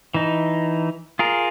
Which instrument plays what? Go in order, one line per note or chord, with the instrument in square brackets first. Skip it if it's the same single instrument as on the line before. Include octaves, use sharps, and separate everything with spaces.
[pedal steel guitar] E3 D#4
F4 G#4 A#4